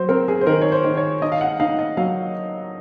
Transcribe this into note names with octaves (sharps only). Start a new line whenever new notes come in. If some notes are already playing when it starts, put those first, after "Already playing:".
Already playing: F#3 C5
C4 A#4
G#4
C5
D#3 A#4
C#5
C5
D#3
C#5
D#4 D#5
F5
F#5
D#4 F5
D#5
F#3 F5